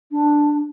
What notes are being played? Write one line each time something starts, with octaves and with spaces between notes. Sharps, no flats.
D4